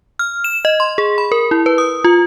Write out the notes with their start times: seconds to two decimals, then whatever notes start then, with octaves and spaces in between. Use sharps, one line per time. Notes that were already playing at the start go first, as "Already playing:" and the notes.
0.19 F6
0.44 E7
0.65 D#5
0.80 C6
0.98 G#4
1.18 B5
1.32 A#4
1.51 E4
1.66 B4
1.78 D#6
2.04 F4